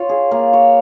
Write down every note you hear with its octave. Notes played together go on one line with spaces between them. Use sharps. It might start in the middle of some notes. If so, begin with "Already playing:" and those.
Already playing: F4 C#5
G#4
A#3
C#5